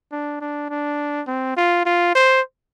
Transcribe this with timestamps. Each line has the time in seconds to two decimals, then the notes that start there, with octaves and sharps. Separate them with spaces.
0.12 D4
0.41 D4
0.70 D4
1.27 C4
1.57 F4
1.86 F4
2.15 C5